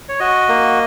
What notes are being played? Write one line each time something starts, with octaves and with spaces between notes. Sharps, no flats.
C#5
F#4 D#5
A#3